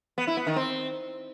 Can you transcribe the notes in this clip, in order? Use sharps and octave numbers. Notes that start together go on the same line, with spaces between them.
B3
E4
B3
D#3
C4